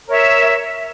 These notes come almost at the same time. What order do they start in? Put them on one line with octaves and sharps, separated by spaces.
A#4 C#5 E5